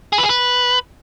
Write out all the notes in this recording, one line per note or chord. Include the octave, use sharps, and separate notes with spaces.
G#4
B4
G#4
B4